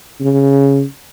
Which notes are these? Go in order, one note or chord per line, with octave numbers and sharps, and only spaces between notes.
C#3